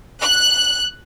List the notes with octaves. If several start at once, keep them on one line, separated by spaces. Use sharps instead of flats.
F#6